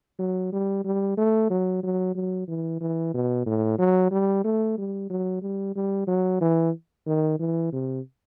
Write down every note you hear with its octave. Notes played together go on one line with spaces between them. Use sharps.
F#3
G3
G3
A3
F#3
F#3
F#3
E3
E3
B2
A2
F#3
G3
A3
G3
F#3
G3
G3
F#3
E3
D#3
E3
C3